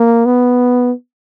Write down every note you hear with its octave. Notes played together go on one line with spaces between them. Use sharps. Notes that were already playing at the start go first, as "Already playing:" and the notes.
Already playing: A#3
B3